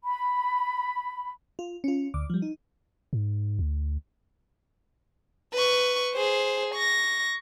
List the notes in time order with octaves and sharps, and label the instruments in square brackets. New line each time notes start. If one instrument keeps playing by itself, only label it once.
[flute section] B5
[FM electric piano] F4
C#4 F4
D2 D6
F3 G3
D#4
[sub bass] G#2
D2
[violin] B4 C#6
G#4 C5
C#6 A#6